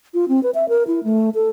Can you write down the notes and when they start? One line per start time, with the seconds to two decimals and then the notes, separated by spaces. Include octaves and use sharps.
0.14 F4
0.29 C4
0.43 B4
0.55 E5
0.69 A#4
0.87 E4
1.04 A3
1.35 A4